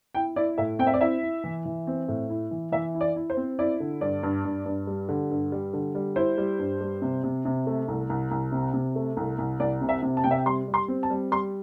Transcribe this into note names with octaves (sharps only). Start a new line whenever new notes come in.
E4 G5
E4 D5
A2 E5
C4 G5
E5
D5
E4 E5
E4
E3
E3
C4
A2
E4
E3
E3 E5
E4
D5
E4
C5
C4
E4 D5
D3
G2 D5
G2
G2
G2
G3
D3
G2
G3
D3
G3
E4 C5
G3
G2
G3
C3
C3
C3
A3
C2
C2
C2
C3
C3
A3
C2
C2
C2 D5
C3
E5
C3
A5
C3 G5
E5
G5
G3 C6
G3
C6
C4
A5
G3
G3 C6